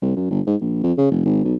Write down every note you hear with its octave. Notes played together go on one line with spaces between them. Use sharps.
C2
F#2
G1
G#2
A#1
F2
C#3
F1
G#1
B1